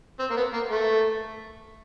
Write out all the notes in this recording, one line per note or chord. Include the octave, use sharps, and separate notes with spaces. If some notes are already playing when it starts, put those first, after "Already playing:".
C4
A#3
B3
A#3
A3